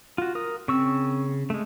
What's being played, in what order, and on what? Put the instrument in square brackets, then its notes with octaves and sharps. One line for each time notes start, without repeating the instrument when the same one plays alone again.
[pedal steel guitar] F4 F#4
A#4 D#6
[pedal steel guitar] C#3 C#6 E6 [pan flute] C4
[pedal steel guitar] G#3 A3